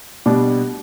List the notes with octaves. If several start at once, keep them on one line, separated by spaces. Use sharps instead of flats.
B2 G3 D4